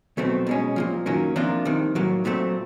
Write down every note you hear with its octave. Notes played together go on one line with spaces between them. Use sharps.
C2 B2 F#3 A3 C4
B2 G#3 C#4
C2 A#2 F3
F#2 D#3 F#3 A#3 C#4
C3 F3 A#3 D4 F4
C2 C3 D#3
A2 F#3 A#3
A#2 F#3 A3 C4